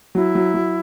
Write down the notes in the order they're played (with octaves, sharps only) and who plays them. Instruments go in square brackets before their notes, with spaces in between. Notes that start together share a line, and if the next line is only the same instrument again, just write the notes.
[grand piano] F#3 [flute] E4
[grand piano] F#3
F#3